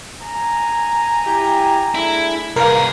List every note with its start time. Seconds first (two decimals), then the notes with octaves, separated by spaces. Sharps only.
0.23 G#5 A#5
1.26 E4 G4 G5
1.95 A3 D4 E4 G#4
2.56 C2 G#4 A#4 B4 D5 F5